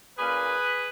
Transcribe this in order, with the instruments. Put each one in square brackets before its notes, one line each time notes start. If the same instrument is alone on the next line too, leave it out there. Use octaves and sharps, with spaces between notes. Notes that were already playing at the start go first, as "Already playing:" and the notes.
[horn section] A#2 A#3 C#4 G#4 B4